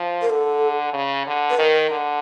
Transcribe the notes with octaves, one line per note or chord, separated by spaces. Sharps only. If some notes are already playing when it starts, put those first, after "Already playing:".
Already playing: F3
A#4
D3 A4
C#3
D3
B4
D#3 A#4
D3